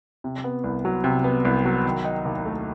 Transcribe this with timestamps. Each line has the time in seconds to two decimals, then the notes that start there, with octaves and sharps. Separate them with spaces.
0.24 C3
0.44 B3
0.64 C2
0.85 F#3
1.04 C3
1.24 B3
1.45 C2
1.65 F#3
1.86 D#3
2.05 D#4
2.26 D#2
2.45 A3